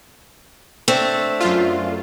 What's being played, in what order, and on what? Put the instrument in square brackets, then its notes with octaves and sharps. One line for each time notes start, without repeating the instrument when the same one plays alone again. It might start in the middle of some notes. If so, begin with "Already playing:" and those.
[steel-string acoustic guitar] A3 C4 D4
[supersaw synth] F#2 F4